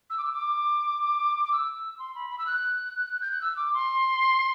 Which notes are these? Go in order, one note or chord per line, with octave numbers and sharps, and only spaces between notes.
E6
D6
E6
D6
D6
E6
C6
B5
B5
E6
F#6
G6
F#6
E6
D6
C6